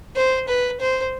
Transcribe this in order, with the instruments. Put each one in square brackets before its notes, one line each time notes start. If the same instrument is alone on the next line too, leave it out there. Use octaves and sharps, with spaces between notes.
[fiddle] C5
B4
C5